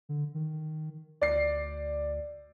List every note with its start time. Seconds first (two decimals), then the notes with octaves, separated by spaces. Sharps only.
0.09 D3
0.34 D#3
1.21 D2 D5 C7